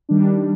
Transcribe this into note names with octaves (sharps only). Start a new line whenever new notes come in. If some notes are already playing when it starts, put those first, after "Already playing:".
D#3 G3 D4